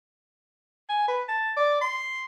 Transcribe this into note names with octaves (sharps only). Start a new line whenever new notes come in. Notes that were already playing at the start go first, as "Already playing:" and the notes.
G#5
B4
A5
D5
C6